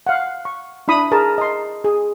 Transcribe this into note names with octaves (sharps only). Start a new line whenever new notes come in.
F5 F#5
C#6
D4 E4 B5 D#6
G#4 A#4 A5
D#5 A#5 C6
G#4